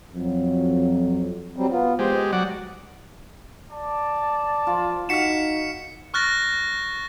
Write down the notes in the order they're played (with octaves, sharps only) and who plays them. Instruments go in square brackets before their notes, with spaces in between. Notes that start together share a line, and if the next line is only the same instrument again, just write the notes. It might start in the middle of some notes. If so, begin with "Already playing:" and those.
[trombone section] F2 F#3
[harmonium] F#3 G3 C4
B3 F4
[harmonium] E2 F3 C5 [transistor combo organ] G#3 G4
[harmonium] D#5
[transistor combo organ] F#3 D5 F#5
[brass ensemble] D5 A5
[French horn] F3 [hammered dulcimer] F4
[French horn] D#4 [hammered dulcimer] F#4 F5 [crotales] B6 C#7 E7
[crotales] C#6 F6 F#6 A6 A#6